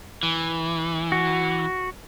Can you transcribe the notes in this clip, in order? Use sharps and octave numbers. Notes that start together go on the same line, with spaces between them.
E3
F#4